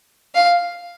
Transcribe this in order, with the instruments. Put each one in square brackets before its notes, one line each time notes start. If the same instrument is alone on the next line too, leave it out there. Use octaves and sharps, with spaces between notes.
[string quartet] F5